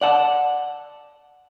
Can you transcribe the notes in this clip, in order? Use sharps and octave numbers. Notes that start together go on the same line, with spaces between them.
D5 F#5 A5